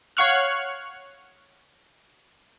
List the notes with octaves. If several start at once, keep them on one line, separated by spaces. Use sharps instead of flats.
C#5 F5 F#5 C#6 F6 F#6